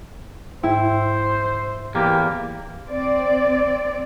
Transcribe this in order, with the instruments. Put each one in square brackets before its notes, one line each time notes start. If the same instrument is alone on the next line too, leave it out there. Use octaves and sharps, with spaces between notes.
[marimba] G#2 G5 [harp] E4 [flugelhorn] C5
[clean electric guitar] E2 A#3 [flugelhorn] G4
[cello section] C4 D5